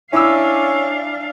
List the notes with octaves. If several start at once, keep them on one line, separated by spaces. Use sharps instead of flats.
C#4 D4 E4 F5 D6 E6